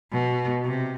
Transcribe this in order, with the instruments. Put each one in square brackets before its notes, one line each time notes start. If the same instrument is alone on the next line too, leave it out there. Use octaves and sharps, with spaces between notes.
[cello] B2
C3